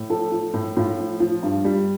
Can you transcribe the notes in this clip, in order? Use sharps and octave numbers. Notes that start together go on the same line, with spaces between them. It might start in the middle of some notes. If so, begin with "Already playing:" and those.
Already playing: A2
F3 A4
F3
A2
A2 F4
F3
F3
G2
G3